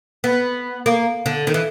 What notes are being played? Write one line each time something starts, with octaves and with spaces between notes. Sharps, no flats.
B3
A#3
D3
D#3
E3